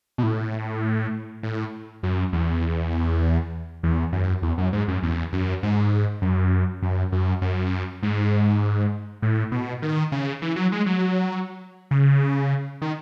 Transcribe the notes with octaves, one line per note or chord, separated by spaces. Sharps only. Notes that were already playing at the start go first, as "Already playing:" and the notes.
B2
A2
A2
F#2
E2
E2
F#2
E2
F#2
G#2
F#2
E2
F#2
G#2
F#2
F#2
F#2
F#2
G#2
A2
B2
D#3
C#3
E3
F#3
G#3
F#3
C#3
D#3